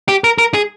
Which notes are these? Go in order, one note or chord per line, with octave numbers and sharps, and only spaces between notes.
G4
A#4
A#4
G#4